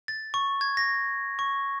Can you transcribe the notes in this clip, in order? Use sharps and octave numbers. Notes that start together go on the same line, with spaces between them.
A6
C#6
G#6
A#6
C#6